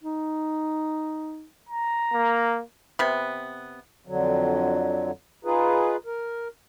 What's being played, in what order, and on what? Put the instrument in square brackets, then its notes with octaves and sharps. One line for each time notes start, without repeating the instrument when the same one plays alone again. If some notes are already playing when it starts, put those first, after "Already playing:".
[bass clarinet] D#4
[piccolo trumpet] A#5
[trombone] A#3
[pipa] C3 B3
[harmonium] F2 D3 F#3
D#4 F4 G#4 B4
A#4